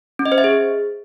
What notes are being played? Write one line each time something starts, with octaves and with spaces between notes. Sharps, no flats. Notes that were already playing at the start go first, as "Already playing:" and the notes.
C#4
D#5
C5
E5
G#4